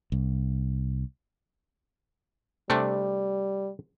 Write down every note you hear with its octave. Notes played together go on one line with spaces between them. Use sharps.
C2
C3 G3 A3 D4